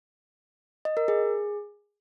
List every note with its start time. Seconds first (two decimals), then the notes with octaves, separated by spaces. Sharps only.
0.85 D#5
0.97 A#4
1.08 G#4